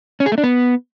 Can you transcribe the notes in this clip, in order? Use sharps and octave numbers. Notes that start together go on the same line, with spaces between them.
C#4
G#4
A3
D4
B3